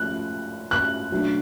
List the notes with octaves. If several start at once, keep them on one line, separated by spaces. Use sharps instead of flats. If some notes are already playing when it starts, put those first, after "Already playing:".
Already playing: F3 A3 C#4 F#6
F#6
B2 F#3 A3 D4